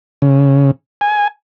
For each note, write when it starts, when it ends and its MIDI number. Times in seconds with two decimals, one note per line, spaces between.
0.22 0.71 49
1.01 1.28 80